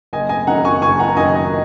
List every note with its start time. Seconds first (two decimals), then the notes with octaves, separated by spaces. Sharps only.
0.13 F#1 D#5 G#5
0.29 D#5 G#5
0.47 F#2 D#3 F#5 A#5
0.65 G#5 C#6
0.82 F#1 G#5 C#6
0.99 F#5 A#5
1.16 F#2 D#3 D#5 G#5
1.34 D#5